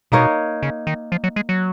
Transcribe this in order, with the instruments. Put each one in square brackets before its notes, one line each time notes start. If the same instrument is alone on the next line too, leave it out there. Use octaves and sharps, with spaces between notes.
[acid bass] B2 [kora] A#3 D#4 A#4 C#5
[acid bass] C#3
D#3
F3
F#3
G#3
F#3